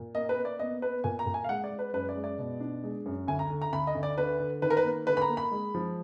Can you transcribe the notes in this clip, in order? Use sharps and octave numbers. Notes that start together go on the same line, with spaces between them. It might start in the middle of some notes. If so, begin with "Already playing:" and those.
Already playing: A#2
A#3 D#5
B4
A#3
D5
B3 D#5
B3 B4
A#2 G#5
A#5
A#2
G#5
F5
G#3 F#5
D5
G#3
B4
F#2 B4
D5
G#3
D5
B2
D4
G#3
F#2
D2 G#5
A#5
D3
A#5
D2 B5
D#5
D2
D5
D3 B4
D3
D#3 B4
A#4
B4
A#3
D3 B4
B5
A#5
A#3
B5
G#3
F3